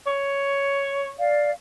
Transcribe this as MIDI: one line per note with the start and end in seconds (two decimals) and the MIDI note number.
0.07 1.14 73
1.18 1.51 74
1.18 1.51 77